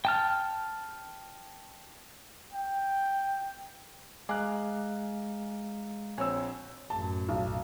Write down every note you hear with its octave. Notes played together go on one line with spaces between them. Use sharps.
G5 A5 F6
G5
G#3 F5 G#5 A#5 D6 F#6
A#1 C4 C#5 G#5 E6
A1 F#2 A5
B1